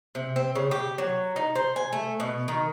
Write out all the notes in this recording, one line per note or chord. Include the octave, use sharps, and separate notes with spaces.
C3
C4
C#3
G4
F#3
D#4
C5
G#5
A3
B2
D#3